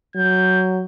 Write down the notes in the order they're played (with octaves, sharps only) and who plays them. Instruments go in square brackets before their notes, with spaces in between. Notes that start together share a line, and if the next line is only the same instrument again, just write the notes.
[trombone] F#3 [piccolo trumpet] G6